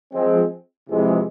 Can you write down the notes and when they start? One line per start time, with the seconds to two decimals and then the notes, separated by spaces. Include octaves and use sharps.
0.12 F3 G#3 C4
0.89 F2 C3 E3 G#3